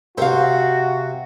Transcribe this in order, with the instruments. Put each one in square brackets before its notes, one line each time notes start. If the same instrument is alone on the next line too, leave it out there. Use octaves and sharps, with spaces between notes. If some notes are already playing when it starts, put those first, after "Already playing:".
[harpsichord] C3 [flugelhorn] F#4 [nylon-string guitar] C5 F5